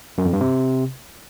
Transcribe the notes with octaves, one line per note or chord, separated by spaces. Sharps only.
F#2
F2
G2
C3